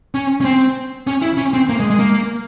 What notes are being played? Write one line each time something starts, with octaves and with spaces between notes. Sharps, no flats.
C#4
C#4
C4
C#4
E4
C#4
C4
A#3
G#3
G#3
A#3